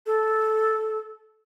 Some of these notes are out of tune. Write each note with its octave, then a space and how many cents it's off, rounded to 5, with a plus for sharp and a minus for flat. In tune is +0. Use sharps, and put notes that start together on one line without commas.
A4 -10